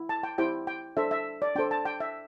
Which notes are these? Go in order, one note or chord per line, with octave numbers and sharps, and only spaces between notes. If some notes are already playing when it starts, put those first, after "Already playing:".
Already playing: E4
A5
G5
E4 G4 C5 G5
G5
D4 A4 C5 E5
E5
D5
D4 A4 C5 G5
A5
G5
E5